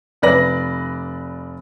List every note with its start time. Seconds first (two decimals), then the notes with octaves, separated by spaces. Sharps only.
0.22 F1 B4 D5 A#6 F#7